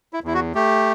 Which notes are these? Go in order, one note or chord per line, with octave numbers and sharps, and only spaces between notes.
E4
E2 E4
F#4
A3 G4